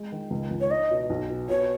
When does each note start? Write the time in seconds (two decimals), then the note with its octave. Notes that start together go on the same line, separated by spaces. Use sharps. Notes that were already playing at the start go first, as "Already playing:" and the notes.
Already playing: G#3
0.12 D#3
0.30 C#2
0.51 C#2
0.61 C#5
0.70 D#4 D#5
0.90 B2
1.10 B1
1.29 B2
1.49 B2 C#5